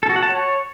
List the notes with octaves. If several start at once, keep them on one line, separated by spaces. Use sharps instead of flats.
A4
F#4
F#5
A5
C#5